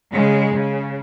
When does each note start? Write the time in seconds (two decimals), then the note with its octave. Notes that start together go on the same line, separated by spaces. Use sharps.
0.12 C#3 G#3
0.55 C#3